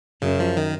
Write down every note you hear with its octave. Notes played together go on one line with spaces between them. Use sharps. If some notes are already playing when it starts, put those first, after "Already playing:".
F#2 C#3
F3
D#3